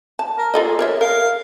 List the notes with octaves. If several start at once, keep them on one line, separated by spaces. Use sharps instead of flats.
A5
A#4
F4 G#4 A4 D#5
A#4 C#5 E5
A#4 F5